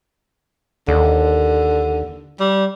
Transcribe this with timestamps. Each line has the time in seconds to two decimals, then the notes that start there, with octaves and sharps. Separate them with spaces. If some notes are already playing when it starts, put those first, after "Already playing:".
0.88 D#2 D3
2.40 G3